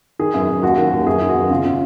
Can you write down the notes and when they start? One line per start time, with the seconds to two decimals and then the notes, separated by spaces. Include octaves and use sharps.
0.19 D#3 G#4
0.34 F#2
0.49 F#2
0.63 D#2 F#4
0.77 D#3
0.92 D#2
1.07 F#2 G#4
1.21 D#3
1.28 F#4
1.36 F#2
1.50 C#3 F4
1.65 C#3